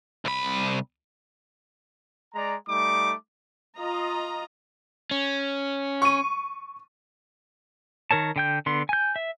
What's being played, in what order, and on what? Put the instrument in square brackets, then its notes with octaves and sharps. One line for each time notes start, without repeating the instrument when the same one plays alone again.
[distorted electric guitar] C2 B5
[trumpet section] G#3 D5 A#5
G3 A3 D#4 D6
[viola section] F4 D#5 A#5
[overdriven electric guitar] C#4
[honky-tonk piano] C#6 D#7
[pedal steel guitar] D#3 A#4 C#5 A5
D3 G5 G6
D3 B3 C6
G#5 G6
E5